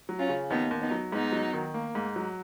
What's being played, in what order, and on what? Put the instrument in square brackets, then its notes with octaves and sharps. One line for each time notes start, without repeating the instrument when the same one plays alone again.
[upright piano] F#3
[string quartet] C#4 F4
[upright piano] C#3
[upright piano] D#2 [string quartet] B3 D#4
[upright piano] D#2
[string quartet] B3 D#4
[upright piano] F#3
[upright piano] G#2 [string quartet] B3 D#4
[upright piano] F#3
D#3
A#3
G#2
F#3